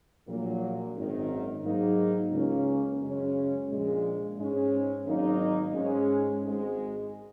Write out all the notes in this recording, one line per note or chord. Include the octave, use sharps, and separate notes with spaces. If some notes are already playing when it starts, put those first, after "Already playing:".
A#1 A#2 F#3 A#3
G#1 F#2 D#3
G#2 F#3 A#3 D#4
C#2 C#3 A#3 C#4
F#2 C#3 G#3 C#4
A#1 A#2 G#3
G#2 G#3 C#4
G#1 G#2 F#3 A#3 D#4
G#2 G#3 C#4
G#1 G#2 G#3